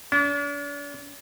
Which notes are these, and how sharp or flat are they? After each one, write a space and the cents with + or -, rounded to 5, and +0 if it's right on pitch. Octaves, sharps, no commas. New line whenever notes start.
D4 -45